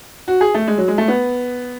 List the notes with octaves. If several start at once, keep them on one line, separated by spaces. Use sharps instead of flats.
F#4
G#4
A3
G#3
F#3
G#3
A3
B3